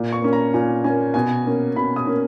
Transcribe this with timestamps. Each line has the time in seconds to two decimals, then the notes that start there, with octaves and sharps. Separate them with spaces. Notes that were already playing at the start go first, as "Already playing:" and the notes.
Already playing: A#2
0.13 C#6
0.22 A#3 C#4
0.33 A#5
0.54 A#2 G#5
0.84 A#3 C#4 G#5
1.14 B2 G#5
1.45 A#3 C#4
1.76 B2 B5
1.96 D#6
2.07 A#3 C#4